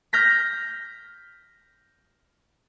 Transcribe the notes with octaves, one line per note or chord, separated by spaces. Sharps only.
F6 G6 A#6 B6